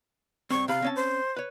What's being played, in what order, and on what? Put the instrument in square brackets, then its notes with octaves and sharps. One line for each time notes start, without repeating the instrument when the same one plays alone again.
[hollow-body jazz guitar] G2 C4 [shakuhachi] C#6
[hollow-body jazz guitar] C3 B5 [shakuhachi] F5
[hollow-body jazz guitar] C4 C#4 A5
[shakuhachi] C5
[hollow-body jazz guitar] B4 C#5